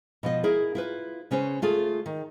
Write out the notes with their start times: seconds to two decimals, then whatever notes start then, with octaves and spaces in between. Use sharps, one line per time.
0.23 B2 F3 D#5
0.43 E4 G#4 A#4
0.75 E4 F4 B4
1.31 C#3 C#4 B4 C5
1.62 A3 F4 G#4 A4
2.06 D#3